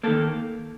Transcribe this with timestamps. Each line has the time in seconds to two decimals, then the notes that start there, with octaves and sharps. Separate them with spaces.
0.03 D#3 A#3 A4